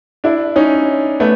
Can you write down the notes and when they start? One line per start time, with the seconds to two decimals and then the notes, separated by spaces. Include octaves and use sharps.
0.24 D4 E4
0.56 C#4 D#4
1.20 A3 B3